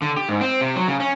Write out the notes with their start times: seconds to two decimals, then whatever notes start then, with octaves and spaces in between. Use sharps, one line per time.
0.02 D3
0.17 G4
0.29 G#2
0.41 C4
0.61 C3
0.76 F#3
0.88 C#3
1.00 C#4